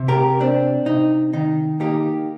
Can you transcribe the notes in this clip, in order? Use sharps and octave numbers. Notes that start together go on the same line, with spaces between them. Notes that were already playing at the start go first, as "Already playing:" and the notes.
Already playing: C3
G4 A#4
C4 D4
C3 D#4
D#3 D#4
A#3 D#4 G4